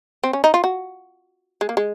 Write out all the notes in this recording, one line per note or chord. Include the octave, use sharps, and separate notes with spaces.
C4
C#4
D#4
F4
F#4
G#3
A#3
G#3